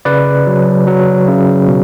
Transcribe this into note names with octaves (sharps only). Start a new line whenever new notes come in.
C#3 B4 D5
F#3
F#3
C#3
B2